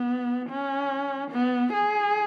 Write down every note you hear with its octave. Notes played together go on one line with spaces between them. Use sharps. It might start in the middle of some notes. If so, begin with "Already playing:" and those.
Already playing: B3
C#4
B3
G#4